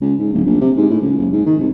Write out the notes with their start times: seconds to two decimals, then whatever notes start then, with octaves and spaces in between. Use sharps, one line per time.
0.01 C#2
0.19 G#2
0.33 D1
0.46 A#1
0.61 C3
0.77 G#2
0.90 A2
1.01 C#2
1.18 F#1
1.33 G#2
1.46 D#3
1.60 C2